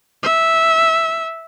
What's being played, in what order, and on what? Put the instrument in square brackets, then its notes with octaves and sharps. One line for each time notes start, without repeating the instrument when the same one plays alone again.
[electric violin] E5